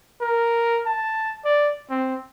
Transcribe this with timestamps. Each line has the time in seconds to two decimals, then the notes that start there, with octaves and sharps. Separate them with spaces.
0.21 A#4
0.86 A5
1.45 D5
1.91 C4